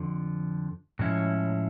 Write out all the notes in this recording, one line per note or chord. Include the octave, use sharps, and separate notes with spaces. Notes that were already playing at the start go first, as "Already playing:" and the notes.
Already playing: F2 D3 F3
A2 F3 G#3 C#4 E4